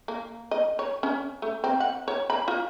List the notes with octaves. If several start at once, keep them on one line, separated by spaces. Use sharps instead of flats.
A#3
D#5
C#5
C#4
A3
C4
F#5
C#5
B5
F4